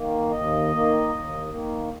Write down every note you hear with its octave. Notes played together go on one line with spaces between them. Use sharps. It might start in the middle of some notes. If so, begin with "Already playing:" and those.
Already playing: D#3 A#3
D#2 D#5
D#3 A#3
D#2
D#3 A#3